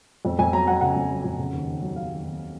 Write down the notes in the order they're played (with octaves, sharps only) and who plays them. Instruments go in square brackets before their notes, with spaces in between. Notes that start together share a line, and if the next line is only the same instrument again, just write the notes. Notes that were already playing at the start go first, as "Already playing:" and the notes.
[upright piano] F2
F2 G#5
F#3 A#5
F#3 F#5
C#3 F#5
F2
F#3
F2
C#3
D#2
D#2
F#3
F#3 F5
D#2
D#2